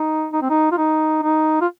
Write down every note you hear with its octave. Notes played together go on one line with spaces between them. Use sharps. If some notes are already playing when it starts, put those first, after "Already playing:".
Already playing: D#4
D#4
C4
D#4
F4
D#4
D#4
F4